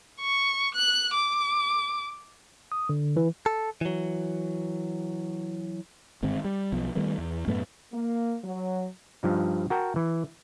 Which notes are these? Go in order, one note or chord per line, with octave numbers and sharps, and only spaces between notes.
C#6
F#6
D6
D#6
D3
E3
A4
E3 F#3
G1 G#2 D#3 C4
G3
B1 F3 B3
D#3 G3 A3 B3
E2
F#2 A2 A3 B3
A#3
F#3
G2 F3 D#4
F#4 A#4 G5 A5
E3